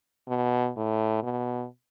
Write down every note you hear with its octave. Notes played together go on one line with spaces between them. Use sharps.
B2
A2
B2